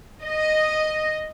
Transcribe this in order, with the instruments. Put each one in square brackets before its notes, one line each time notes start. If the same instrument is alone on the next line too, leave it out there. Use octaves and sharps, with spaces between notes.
[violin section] D#5